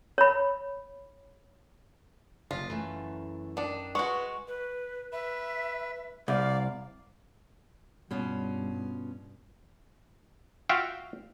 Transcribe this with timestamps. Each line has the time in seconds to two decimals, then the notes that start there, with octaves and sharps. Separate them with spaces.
0.18 C#5 B5
2.51 F#1 C3 F4 D#5
2.70 F#2 E3 A3
3.57 D#3 D4
3.95 G#3 F#4 B4 C#6
4.48 B4
5.12 B4 E5
6.28 C2 D5 F5
8.11 G2 B2 C#4 F4
10.69 F4 F#4 E5 F5 G5